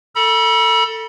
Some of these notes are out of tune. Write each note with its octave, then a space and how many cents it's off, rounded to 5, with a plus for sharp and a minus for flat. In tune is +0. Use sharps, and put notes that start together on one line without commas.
A4 +15 B5 -40